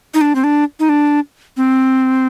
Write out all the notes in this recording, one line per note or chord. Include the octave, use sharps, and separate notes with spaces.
D#4
D4
C4
D4
D#4
D4
C4